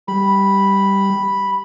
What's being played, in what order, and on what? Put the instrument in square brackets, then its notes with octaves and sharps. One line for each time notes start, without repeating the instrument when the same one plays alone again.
[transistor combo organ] G3 [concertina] B5